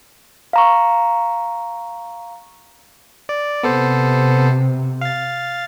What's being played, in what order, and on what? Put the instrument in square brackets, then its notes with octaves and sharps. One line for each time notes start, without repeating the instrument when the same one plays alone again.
[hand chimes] F5 A#5 C#6
[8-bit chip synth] D5
[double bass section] C3 [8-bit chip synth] B3 A4 C5
[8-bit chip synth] F5 A6